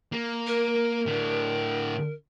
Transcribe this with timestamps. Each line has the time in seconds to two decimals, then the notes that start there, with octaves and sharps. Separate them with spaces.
0.12 A#3
0.47 A#4
1.06 A2 D3